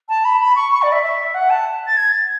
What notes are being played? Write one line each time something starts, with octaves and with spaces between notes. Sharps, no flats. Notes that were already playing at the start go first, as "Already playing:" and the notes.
A5
B5
B5
C#6
C#6
D5
E5
E5
F#5
A5
A6
G#6
A6